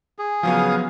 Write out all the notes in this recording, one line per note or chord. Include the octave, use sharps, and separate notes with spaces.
G#4
C#3 F3 F#3 B3 F5 D#6